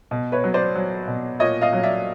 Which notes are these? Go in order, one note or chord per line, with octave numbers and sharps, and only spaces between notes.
B2
B4 C#5
F#3
C5 D5
F#3
B2
A#2 C#5 D#5
D#5 F5
F#3
D5 E5